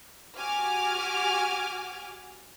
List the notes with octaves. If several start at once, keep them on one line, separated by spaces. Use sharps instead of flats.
F#4 G4 G#5 D6 F6